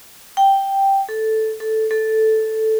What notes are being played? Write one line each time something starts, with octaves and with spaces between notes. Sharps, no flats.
G5
A4
A4
A4